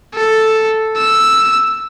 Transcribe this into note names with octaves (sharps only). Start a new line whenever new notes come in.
A4
E6